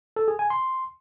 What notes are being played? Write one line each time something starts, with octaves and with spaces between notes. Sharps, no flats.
A4
G#4
G#5
C6